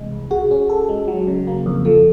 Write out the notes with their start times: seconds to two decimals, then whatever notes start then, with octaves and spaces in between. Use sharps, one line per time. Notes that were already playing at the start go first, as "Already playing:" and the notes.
Already playing: C3 E3 G#3
0.12 C2
0.31 F#4 G#4
0.51 C#4
0.69 A4
0.89 G#3
1.08 F#3
1.27 C#3
1.47 A#3
1.66 F2
1.85 F3 A4